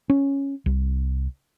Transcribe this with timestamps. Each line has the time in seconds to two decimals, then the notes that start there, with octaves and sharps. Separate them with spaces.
0.10 C#4
0.66 C2